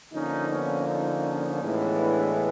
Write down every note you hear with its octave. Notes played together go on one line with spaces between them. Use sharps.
D3 F3 A#3 C#4 D#4
B3 C#4
C#4 D#4
A2 E3 G#3 B3
D4 E4